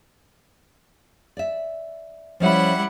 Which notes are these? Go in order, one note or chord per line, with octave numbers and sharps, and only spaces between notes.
D5 E5
F3 G3 C#4 E4 E5 F#5